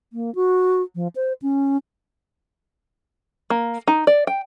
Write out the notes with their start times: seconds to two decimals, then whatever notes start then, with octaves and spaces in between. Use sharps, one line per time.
0.13 A#3
0.35 F#4
0.95 F3
1.16 C5
1.42 C#4
3.50 A#3
3.88 D#4
4.07 D5
4.27 G5